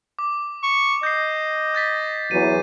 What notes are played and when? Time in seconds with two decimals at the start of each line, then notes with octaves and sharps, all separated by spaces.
0.19 D6
0.63 C#6
1.03 D#5 G6 C7
1.75 G6 A6 B6
2.31 E2 F#3 D#7